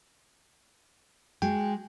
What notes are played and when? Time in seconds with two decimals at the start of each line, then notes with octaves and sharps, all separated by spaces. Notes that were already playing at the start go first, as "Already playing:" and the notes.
1.42 G#3 F#4 G#4 G5